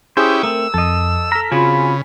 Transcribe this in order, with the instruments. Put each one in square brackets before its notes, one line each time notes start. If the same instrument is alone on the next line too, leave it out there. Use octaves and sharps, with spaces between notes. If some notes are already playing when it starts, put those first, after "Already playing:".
[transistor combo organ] C#4 E4 G4 [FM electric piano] G#4 D#6 [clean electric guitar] C5
[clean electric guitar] A3 A#3 C4 [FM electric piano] A#4 [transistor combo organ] E6
[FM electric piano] F2 [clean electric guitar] A4 D#5
[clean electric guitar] A4 A#5 [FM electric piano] F6 B6
[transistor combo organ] C#3 [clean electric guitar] C4 F#4 G#4 [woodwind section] F4 B5 [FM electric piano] G#5